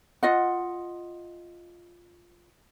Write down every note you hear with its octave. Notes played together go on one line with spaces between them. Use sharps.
F4 D#5 F#5